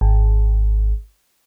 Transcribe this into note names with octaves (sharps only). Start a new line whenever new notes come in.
G#1